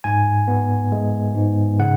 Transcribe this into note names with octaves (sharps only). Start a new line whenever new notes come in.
G#2 G#5
B3
G#3
G#2
C#3 F#5